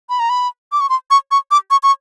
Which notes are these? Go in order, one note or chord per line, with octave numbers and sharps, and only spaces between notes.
B5
A#5
B5
D6
C#6
C6
C#6
C#6
D6
C#6
C#6